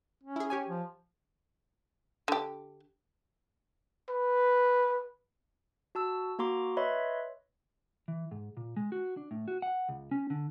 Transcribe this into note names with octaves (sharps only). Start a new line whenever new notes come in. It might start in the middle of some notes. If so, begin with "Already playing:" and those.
C#4
E4 G#4
G4 C#5 G#5
F3
D3 G4
B4
F#4 A5 E6
A#3 F#4 A#5 C6 D6
B4 C#5 D#5 E5 B5 C6
E3
G#2
A#2
G#3
F#4
D4
A2
F#4
F#5
C#2
C#4
D3